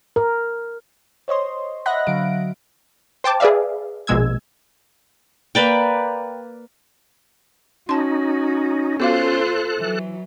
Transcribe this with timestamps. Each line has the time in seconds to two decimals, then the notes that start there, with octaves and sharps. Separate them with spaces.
0.16 A#4
1.28 C5 C#5 D#5 C6
1.86 D#5 E5 F#5 B5 F#6 A#6
2.07 D3 F#3 F5 D7
3.24 C5 G5 A5 D6
3.40 G#4 B4 D5 E5 F5
4.07 A#1 B2 G#3 E6 G#6
5.55 A#3 B4 D5 G5
7.89 C#4 D#4 F#4 A5 C6
9.00 B3 F4 F#4 A4 C5 F5 F#6
9.79 E3 F#3